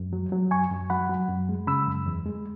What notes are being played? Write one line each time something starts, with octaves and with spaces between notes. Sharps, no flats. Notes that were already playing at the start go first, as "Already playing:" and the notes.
Already playing: F#2
F#3
F#3
F#2 G#5 C#6
F#2
F#3 F#5 B5
F#3
F#2
G#3
C#3 B5 E6
F#2
E2
G#3